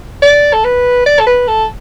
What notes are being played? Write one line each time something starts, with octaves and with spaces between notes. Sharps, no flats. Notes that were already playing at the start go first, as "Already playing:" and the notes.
D5
A4
B4
D5
A4
B4
A4